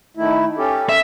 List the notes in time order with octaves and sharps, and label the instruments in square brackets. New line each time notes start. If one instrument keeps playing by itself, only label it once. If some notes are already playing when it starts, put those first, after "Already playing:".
[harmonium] D#3 A3 E4
C#4 G4 A4
[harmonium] A4 [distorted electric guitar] E5